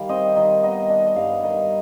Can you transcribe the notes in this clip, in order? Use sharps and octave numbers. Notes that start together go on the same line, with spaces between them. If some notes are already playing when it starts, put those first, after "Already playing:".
Already playing: D#3 G3 F5
C4 D#5
D#3 D#5
B3 D#5
D4 D#5
D#5
G2 F5
D#3 D#5